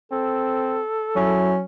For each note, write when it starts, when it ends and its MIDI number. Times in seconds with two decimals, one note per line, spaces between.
0.12 0.82 60
0.12 1.55 69
1.16 1.64 54
1.16 1.60 61
1.16 1.55 64